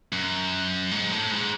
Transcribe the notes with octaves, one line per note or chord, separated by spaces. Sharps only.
F#2
G#2
A2
G#2